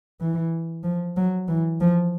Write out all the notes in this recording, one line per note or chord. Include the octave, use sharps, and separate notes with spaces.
E3
F3
F#3
E3
F3